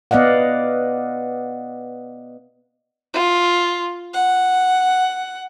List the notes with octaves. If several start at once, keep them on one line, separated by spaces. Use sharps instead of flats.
B3 D5 D#5 F5 F#5
F4
F#5